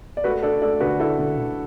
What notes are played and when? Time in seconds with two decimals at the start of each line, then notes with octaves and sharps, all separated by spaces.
0.17 D5
0.24 A3 F#4 B4
0.43 D4 A4 D5
0.62 A3 A4 D5
0.80 D3 F#4 B4
0.99 A3 E4 A4
1.18 D3
1.38 D3